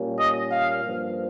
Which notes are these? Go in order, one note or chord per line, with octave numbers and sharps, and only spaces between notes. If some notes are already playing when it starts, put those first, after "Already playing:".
Already playing: A#2 G3 A#3 C#4
D#5
F5
G2 F3 A#3